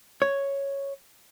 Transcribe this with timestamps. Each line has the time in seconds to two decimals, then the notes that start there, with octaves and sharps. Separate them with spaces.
0.22 C#5